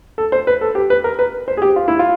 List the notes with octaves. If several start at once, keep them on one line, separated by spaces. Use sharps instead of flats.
A4
C5
B4
A4
G4
B4
A#4
B4
C5
G#4
G4
F4
E4
F4